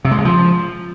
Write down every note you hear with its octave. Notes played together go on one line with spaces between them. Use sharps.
C3
G#3
C#3
F3